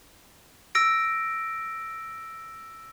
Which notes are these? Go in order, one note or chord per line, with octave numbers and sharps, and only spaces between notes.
E6 A#6 D7